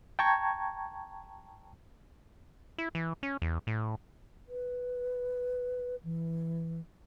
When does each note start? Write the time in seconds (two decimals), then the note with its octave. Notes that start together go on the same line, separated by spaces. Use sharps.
0.19 G5 A5 A#5 C#6 G#6
2.78 E4
2.95 E3
3.23 C#4
3.42 E2
3.67 A2
4.48 B4
6.04 E3